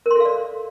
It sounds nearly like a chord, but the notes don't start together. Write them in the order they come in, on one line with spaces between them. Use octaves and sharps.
A#4 C6 A4 F5 D5